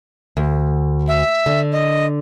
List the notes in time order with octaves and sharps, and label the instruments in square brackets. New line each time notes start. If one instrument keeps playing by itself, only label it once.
[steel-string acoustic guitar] D2
[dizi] E5
[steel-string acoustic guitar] D3
[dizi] D#5